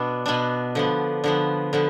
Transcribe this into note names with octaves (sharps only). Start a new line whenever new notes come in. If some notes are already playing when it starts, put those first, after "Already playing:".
Already playing: B2 B3 D4
B2 B3 D4
D3 F3 B3
D3 F3 B3
D3 F3 B3